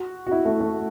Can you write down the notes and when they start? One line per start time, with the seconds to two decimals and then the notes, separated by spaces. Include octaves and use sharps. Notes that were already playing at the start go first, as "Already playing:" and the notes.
Already playing: F#4
0.27 F#4
0.31 E4
0.45 A3
0.61 A3